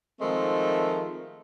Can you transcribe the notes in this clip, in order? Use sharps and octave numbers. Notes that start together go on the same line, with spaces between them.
D#3 F3 G#3 A3 C4 A#4